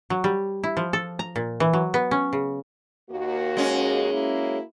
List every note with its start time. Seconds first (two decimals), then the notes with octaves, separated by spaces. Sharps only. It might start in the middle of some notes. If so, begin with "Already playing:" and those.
0.10 F#3
0.24 G3
0.64 E4
0.77 F3
0.93 A4
1.19 A#5
1.36 A#2
1.60 E3
1.73 F#3
1.94 B3
2.11 C#4
2.33 C#3
3.11 D#2 A#3 F#4
3.57 G#3 C#4
4.12 A#3 E4 F#4